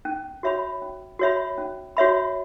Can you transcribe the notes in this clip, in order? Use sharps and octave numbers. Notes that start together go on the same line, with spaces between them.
C#4
F#4 C#5 E5 B5
C#4
F#4 C#5 E5 B5
C#4
F#4 C#5 E5 B5